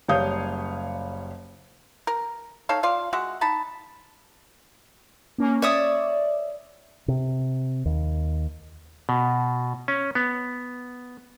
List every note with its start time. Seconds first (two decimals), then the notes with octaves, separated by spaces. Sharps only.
0.08 F#1 G3 C#5 F5 D#6 G6
2.07 A#4
2.69 D#4 A4 C#5 F5
2.83 F4 D5 F5
3.13 G#3 F#4 E5 F#5
3.41 D#4 A5 B5
5.38 A#3 C#4
5.62 C#5 D5 E5 D#6
7.08 C3
7.85 D#2
9.09 B2
9.88 C#4
10.15 B3